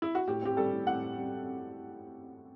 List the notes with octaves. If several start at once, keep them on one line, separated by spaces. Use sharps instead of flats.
E4
F#4
A2 G4
C4 G4
G3 A4
A2
A2 F#5
C4
G3